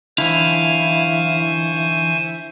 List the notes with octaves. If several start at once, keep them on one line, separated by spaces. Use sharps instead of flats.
D3 E3 E4 C5 F5 G#5 C#6